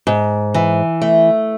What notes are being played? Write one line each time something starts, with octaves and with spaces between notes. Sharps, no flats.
G#2
E3
A3